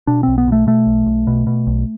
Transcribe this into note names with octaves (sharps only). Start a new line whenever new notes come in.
B2 D4
B1 C4
B3
B2 A3
B2 A3
B1
B1
B2
B2
B1